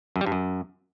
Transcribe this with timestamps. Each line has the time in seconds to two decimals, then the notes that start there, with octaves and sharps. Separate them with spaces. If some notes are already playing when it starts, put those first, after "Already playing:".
0.16 F#2
0.21 G3
0.26 G2
0.32 F#2